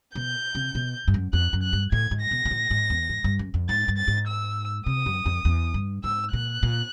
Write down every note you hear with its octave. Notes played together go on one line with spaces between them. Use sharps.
B2 G6
C3
B2
G2
F#2
F2 F#6
F#2
F#6
G2
A2 G#6
G#2
A#6
B2
A#2
A2
G#2
E2
G#2
G2
F#2
F2
G#2 A6
G2
A6
G#2
E6
C3 D#6
F#2
F2
E2
G2
G#2 E6
A#2 F#6
A#2